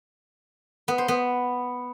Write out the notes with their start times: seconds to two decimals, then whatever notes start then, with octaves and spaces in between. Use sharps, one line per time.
0.88 B3
0.98 C5
1.08 B3